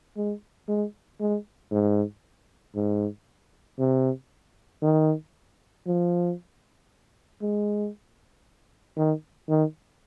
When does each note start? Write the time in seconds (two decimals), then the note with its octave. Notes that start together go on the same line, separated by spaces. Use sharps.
0.17 G#3
0.68 G#3
1.20 G#3
1.71 G#2
2.76 G#2
3.79 C3
4.82 D#3
5.87 F3
7.42 G#3
8.97 D#3
9.49 D#3